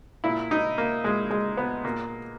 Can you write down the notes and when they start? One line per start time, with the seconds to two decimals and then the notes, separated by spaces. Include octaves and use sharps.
0.24 A#2 E4
0.51 D#4
0.78 A#3
1.04 A#2 G#3
1.31 G#3
1.57 B3
1.84 A#2 A#3